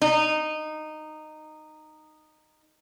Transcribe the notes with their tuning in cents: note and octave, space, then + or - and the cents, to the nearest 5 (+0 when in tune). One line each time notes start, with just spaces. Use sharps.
D#4 -15